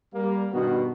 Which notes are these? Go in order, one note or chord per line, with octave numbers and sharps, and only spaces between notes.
G3 A#3
G2 B2 D#3 B3 F#4